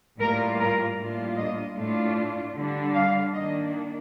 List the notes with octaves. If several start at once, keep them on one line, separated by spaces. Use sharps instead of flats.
A2 G3 A#3 F4 A#4
A#4
A2 G3 A#3 D4 F4
D#5
A2 A3 D4 F4
D3 G3 D4
F5
D#3 A#3 D4 D#5